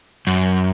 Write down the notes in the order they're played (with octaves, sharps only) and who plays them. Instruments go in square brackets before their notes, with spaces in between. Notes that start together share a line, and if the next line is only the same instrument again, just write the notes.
[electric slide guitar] F#2